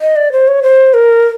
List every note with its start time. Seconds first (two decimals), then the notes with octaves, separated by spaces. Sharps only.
0.01 D#5
0.16 D5
0.32 C5
0.48 C#5
0.63 C5
0.94 A#4